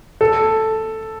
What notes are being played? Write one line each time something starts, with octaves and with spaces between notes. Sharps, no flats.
A4